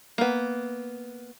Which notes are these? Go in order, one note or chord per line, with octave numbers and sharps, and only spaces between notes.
A#3 B3